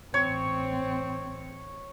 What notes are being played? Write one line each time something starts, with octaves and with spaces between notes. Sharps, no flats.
A1 C4 C#5